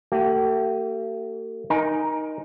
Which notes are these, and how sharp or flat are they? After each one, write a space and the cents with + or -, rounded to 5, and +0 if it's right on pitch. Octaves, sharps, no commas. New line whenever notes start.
A3 +45 G4 -35
D#4 +0 A#4 +20 G#5 +0